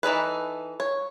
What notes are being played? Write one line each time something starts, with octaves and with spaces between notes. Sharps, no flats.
E3 D#4 A4 B4
C#5